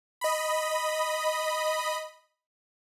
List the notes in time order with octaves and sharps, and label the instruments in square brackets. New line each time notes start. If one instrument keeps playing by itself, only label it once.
[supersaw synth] D#5 B5